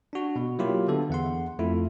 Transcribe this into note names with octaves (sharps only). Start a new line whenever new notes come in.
D4 F#4
B2
F#3 A#3 E4 F4 G4
D3 B3 A4
E2 F#5 C6
F2 A3 E4 F4